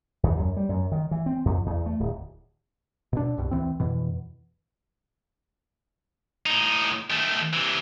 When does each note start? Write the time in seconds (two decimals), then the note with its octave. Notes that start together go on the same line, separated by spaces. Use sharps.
0.23 D#2
0.37 F#2
0.57 G3
0.69 F#2
0.92 D#3
1.11 E3
1.26 C4
1.45 F2
1.66 E2
1.86 A3
2.00 D1
3.13 B2 D4
3.38 C2 G2 B2
3.51 D2 E3 C4
3.80 F2 B2 E3
6.46 A2 D#4
7.11 D#3 A3
7.53 C3 E3